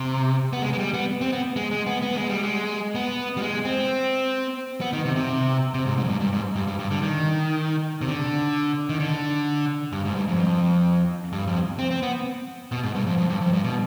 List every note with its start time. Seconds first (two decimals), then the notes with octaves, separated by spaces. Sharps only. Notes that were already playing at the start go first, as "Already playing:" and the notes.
Already playing: C3
0.53 B3
0.62 G#3
0.73 G#3
0.78 G3
0.94 B3
1.21 C4
1.32 B3
1.56 G#3
1.71 G#3
1.86 B3
2.02 B3
2.16 G#3
2.29 G3
2.43 G#3
2.95 B3
3.37 G3
3.42 G#3
3.65 C4
4.81 B3
4.93 D#3
5.05 C3
5.16 C3
5.74 C3
5.86 G#2
5.98 G#2
6.04 F2
6.09 G2
6.20 G2
6.33 G#2
6.56 G2
6.67 G2
6.79 G2
6.91 D3
7.02 D#3
8.01 C3
8.06 D3
8.89 D#3
9.00 D3
9.93 G2
10.05 G#2
10.15 G2
10.28 F2
11.33 G2
11.48 F2
11.79 C4
11.91 C4
12.02 B3
12.72 B2
12.83 G#2
12.95 G2
13.06 F2
13.18 F2
13.30 G2
13.41 F2
13.53 G2
13.64 B2